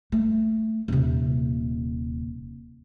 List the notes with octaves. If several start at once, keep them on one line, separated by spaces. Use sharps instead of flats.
A3
D#1 C3